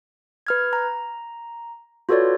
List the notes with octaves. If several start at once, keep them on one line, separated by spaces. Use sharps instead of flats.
B4 F6 G#6
A#5
F4 F#4 A4 B4 C#5 D5